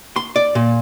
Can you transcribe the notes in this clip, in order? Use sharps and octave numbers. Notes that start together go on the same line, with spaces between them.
C6
D5
A#2